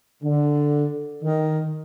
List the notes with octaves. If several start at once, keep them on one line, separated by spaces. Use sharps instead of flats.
D3
D#3